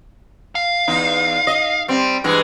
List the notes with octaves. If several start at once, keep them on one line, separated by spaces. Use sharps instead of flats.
F5
E2 D#4
D#5
G3 C4
G2 E3 G#3